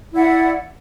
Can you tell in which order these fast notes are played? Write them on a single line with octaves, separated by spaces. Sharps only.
E4 D5 F#5